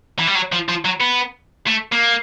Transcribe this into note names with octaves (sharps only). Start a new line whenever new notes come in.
E3
G3
F#3
F3
F3
F#3
B3
A3
A#3